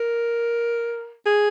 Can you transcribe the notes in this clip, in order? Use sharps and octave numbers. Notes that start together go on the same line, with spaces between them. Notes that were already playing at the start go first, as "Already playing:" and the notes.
Already playing: A#4
G#4